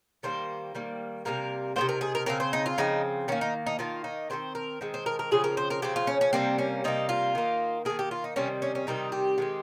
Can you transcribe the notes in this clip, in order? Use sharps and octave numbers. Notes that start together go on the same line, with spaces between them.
D#3 G3 A#3 C5
D#3 G3 A#3
C3 D#3 G3 A#3 A#4
C3 D#3 G3 A#3 C5
A#4
G#4
A#4
C#3 F3 C4 A#4
C5
D#4
F4
C#3 F3 C4 D#4
D#3 A#3 C#4
D#4
D#4
D#3 A#3 F4
D#4
D#3 G#3 C4 C5
A#4
D#3 G#3 C4
C5
A#4
A#4
C#3 F3 C4 G#4
A#4
C5
A#4
C#3 F3 C4 G4
F4
C#4
C#4
C3 G3 A#3 C4
C#4
C3 G3 A#3 D#4
F4
D#3 A#3
D#3 A#3 G#4
G4
F4
D#4
C3 D#3 G3 C4 C#4
C#4
C#4
C3 D#3 G3 C4 D#4
G4
D#3 G#3 C4